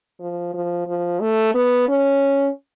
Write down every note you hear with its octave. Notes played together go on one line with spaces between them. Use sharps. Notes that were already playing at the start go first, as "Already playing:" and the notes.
F3
F3
F3
A3
B3
C#4